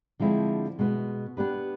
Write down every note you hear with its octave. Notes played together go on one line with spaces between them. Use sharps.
D3 F3 G#3 C4 E4
B2 G#3 B3
B3 D4 G4 B4